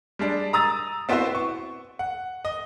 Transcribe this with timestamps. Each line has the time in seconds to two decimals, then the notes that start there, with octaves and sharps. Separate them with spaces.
0.19 G3 G#3 D4
0.53 A#5 D#6 E6 A6
1.09 B3 C4 E4 F#4 B4 C5
1.35 C#6
1.99 F#5
2.45 D#5